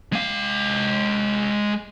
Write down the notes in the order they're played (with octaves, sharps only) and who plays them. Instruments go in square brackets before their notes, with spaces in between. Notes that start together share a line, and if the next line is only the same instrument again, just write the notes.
[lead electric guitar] G#3 F5